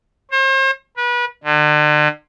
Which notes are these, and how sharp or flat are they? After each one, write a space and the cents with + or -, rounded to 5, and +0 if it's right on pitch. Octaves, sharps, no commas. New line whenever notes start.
C5 +40
B4 -30
D3 +40